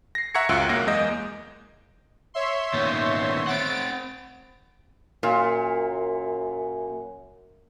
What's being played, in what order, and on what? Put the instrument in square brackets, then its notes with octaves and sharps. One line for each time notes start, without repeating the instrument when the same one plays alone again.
[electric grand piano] A#6 C7
E5 F#5 A#5 C#6 G#6 C#7
C#2 F#2 F4 E6 F#6 D7
B1 F#2 A#3 A#6 D7
E2 G#3 A#3 D#5 G6
[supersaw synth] C#5 E5 C6
[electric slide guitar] A#2 D#3 B3
[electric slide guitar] C4 F#5 [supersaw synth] A6 D7
[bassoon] F#2 [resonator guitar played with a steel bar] A#2